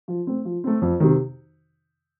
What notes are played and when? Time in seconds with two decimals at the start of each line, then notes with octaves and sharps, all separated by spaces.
0.08 F3
0.27 A3 C4
0.45 F3
0.64 A3 C4
0.82 F2
1.00 C3 D#3